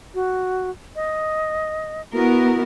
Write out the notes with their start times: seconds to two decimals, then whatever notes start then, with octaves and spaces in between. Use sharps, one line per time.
0.15 F#4
0.96 D#5
2.14 B3 E4 F#4 A#4